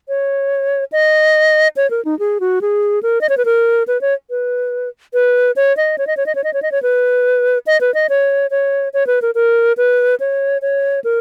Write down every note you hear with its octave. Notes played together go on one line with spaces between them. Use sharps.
C#5
D#5
C#5
A#4
D#4
G#4
F#4
G#4
A#4
D#5
C#5
B4
A#4
B4
C#5
B4
B4
C#5
D#5
C#5
D#5
C#5
D#5
C#5
D#5
C#5
D#5
C#5
B4
D#5
B4
D#5
C#5
C#5
C#5
B4
A#4
A#4
B4
C#5
C#5
A#4